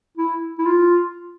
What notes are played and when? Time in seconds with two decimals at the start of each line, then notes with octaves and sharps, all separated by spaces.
0.18 E4
0.59 E4
0.66 F4